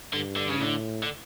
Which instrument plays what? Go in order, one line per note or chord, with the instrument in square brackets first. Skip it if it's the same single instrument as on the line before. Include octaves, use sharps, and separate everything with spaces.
[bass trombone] G2 [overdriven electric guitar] D3
[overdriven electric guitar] D3
C#3
[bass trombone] A2 [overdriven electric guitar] D3
[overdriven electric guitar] D3